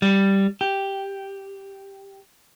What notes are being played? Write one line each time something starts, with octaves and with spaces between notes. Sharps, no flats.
G3
G4